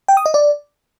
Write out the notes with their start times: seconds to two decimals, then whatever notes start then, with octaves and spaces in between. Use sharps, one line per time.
0.08 G5
0.17 D#6
0.26 D#5
0.34 D5